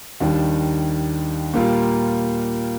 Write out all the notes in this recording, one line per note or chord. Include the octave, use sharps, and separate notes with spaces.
D#2 D#3 G3 D4
A#2 G3 A#3 F4